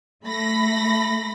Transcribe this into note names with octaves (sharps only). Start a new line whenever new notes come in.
A3 B5 A#6